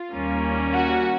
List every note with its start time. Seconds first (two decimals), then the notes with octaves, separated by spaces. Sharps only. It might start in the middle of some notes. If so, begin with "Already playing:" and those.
Already playing: F4
0.13 D#2 D#3 G3 A#3 C#4
0.73 F#4